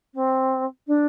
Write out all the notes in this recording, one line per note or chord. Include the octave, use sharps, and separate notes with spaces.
C4
D4